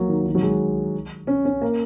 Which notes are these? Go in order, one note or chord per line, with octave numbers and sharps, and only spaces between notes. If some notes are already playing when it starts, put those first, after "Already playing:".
Already playing: F#3 A#3
D#3
D#3
F#3
G#3
C#4
C#4
A#3